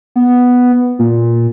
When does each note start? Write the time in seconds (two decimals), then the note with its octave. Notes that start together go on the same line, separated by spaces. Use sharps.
0.16 B3
0.99 A#2